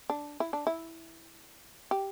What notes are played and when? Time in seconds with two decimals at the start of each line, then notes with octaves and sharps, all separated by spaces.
0.10 D4
0.40 E4
0.53 D4
0.67 E4
1.91 G4